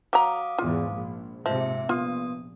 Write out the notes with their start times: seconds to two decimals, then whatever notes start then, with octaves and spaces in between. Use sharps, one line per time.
0.13 F#3 F5 A#5 D6 D#6
0.58 E2 G#2 F4
0.91 A#1
1.46 G#2 C3 F3 E5
1.89 A#1 B3 F4 D#6